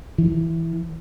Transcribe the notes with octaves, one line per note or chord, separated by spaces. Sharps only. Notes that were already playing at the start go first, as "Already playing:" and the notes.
E3